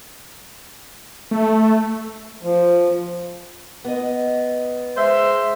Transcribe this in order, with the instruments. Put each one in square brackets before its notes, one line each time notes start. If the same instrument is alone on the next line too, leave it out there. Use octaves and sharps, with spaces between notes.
[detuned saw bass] A3
[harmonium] F3
[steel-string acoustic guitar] B3 D#5
[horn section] G#3 C5 E5